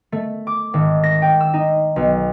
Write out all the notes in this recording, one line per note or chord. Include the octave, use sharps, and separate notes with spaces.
A3
D6
G#1
A#6
G5
E6
D#4
B1